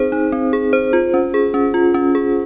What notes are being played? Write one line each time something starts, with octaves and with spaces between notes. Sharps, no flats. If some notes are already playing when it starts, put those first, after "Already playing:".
Already playing: C4 D#4 G#4 C5
D#4
C4
G#4
C5
F4
C#4
G#4
C#4
F4
C#4
G#4